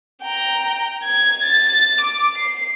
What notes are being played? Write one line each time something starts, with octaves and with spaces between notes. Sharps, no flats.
G5 A#5
G#6
A6
D6
C7